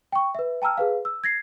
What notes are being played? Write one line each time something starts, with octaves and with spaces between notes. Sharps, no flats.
G5 C#6
B4 E5
G5 A5 A#5 E6 F6
G#4 B4 F5
E6
G#6 A#6 C7